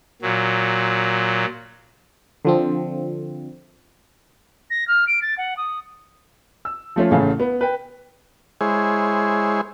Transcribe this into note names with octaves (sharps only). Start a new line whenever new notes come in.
A#2 F#3
D3 F3 C4
A#6
F6
D7
A6
F#5
D#6
E6
F3 A3 C#4 F4
A1 C#3 A3 C#4 G#4 F5
B3
B4 G5
G#3 E4 G#4 C5 C#5